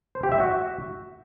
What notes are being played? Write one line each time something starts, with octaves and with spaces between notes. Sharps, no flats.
C5
G4
E5
F#4